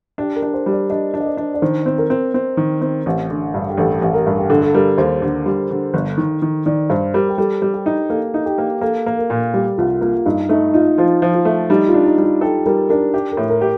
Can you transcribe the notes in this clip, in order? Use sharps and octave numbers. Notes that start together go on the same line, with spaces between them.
D4 G4
A#4
D4
C5
G3
D5
D4 D#5
D4
D#5
D5
D4
D5
D#3 C5
C4
A#4
C4
C4
D#3
C4
A1
D3
G2
G4
A1 A4
A1
A#4
G2
G4
D3 A4
A4
G3 A#4
D#2 C5
D3
G3
D3
G1
D#3
D#3
D#3 D5
G2 C5
G3 A#4
G4
G3 A4
G3
G4
D#4
A#3 A4
D#4
G4
A#3
A#3 A4
A#3
A#4
A#2
G3 G4
C2 F4
A#3 F4
G2 D#4
A3 D#4
D#4 F4
F3 F4
F3
F4
A3
G3 D#4
F4
D4
D#4
G3
F4
G4 A4
G3 A#4
D4 A#4
G4
A#4
A2
A#4
G4